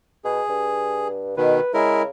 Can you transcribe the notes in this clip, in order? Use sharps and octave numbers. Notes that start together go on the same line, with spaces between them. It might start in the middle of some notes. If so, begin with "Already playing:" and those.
B2 G#4
G2
B2 D#3 B4
C#3 G#3 E4 A#4